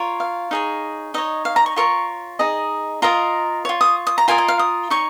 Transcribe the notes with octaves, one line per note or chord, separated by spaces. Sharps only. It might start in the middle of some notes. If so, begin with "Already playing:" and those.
Already playing: F4 A#4 C#5
F5
D#4 G#4 C#5
D#4 C#5 D#5
F5
A#5
C#6
F4 A#4 C#5 C#6
D#4 G#4 D#5
F4 A#4 D#5 A#5
F4 C#5
D#6
D#6
A#5
F4 A#4 D#5 G#5
D#5
F5
D#6
D#4 C#5 C#6